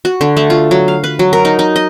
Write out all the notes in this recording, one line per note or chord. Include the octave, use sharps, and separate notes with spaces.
F#4
D3
A3
F4
F#3
F5
B4
F#3
A#4
D#4
D#4
D#5